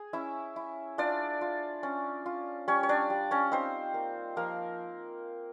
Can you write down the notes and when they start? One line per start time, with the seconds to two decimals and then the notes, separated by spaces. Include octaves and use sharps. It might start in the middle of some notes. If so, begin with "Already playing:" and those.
Already playing: G#4 G#5
0.13 C#4 E4 E5
0.56 E4
0.98 D4 F4 D5
1.41 F4
1.83 C#4
2.26 F4
2.68 G3 C#4 C#5
2.83 C#5
2.89 D4 D5
3.10 G3
3.31 C#4 C#5
3.52 C4 D#4 C5
3.94 A#3
4.36 F3 A#3 A#4